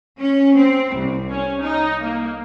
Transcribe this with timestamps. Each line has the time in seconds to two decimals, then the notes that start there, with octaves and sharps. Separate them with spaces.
0.20 C#4
0.57 C4
0.95 C2
1.29 C#4
1.62 D#4
2.02 A#3